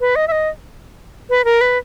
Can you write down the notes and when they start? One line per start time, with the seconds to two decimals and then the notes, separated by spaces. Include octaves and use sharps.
0.01 B4
0.16 D#5
0.28 E5
0.32 D#5
1.30 B4
1.45 A#4
1.61 B4